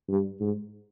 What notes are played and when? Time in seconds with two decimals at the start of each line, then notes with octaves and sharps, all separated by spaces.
0.09 G2
0.41 G#2